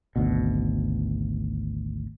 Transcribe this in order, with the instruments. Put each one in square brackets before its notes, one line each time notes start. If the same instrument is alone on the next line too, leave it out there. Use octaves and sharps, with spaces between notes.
[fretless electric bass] G#1 D2 B2